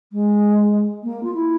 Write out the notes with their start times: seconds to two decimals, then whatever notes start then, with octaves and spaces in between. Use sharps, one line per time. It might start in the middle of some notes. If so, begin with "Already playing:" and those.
0.12 G#3
1.03 A#3
1.23 F4
1.34 E4